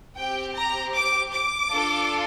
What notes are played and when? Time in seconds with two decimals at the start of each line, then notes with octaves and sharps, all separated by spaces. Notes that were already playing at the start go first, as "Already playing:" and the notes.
0.17 C4 G4 G5
0.55 A#5
0.94 D6
1.32 D6
1.71 D4 F4 A4